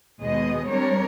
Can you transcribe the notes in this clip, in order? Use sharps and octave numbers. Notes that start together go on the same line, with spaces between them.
D#2 B2 G#3 G#4 D#5
G3 G#3 C4 D4 A#4 C#5